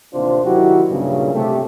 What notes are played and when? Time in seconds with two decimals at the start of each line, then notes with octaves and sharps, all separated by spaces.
0.14 A1 D#2 C3 D4 F4 C5
0.45 D#3 F#3 E4 F#4 G4
0.91 B1 G2 A#2 C#3
1.33 C3 A3 G4